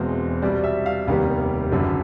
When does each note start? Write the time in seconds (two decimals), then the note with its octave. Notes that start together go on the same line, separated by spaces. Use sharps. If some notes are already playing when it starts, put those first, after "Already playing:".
Already playing: E1 E2 B2 G#3 C4 C5
0.42 C2 B2 G3 D5
0.64 E5
0.86 F5
1.08 F1 D#2 D#3 G3 B3 F5
1.72 F#1 F#2 D3 F#3